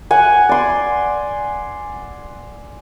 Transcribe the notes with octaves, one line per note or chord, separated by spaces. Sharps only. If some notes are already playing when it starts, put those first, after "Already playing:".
F#5 G#5
D5 C6